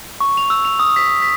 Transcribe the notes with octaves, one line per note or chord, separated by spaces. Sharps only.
C#6
F7
E6
F7
D#6
B6
B6